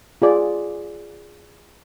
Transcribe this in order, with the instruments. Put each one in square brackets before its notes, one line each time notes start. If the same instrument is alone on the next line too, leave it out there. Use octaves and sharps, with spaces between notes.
[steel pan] F4 G#4 D5